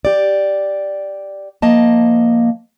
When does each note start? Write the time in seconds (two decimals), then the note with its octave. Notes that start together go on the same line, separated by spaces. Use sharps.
0.05 G4 D5
1.62 F3 A#3 D#5 A5